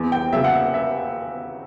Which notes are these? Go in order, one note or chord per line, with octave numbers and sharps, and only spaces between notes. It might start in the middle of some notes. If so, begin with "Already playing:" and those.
Already playing: E2
G5
C#3 F#3 E5
F#5
E5
E5